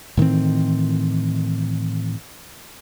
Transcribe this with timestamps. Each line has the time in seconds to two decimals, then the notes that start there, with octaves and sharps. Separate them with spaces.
0.17 A2 D#3 E3 C4